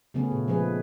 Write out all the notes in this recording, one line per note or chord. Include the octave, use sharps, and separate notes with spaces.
C#3 F#3 A3 B3 C#4
A#2
F3 G#3 G#4 B4